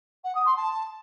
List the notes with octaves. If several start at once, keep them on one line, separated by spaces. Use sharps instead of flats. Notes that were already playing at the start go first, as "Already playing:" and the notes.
F#5
D#6
C6
A5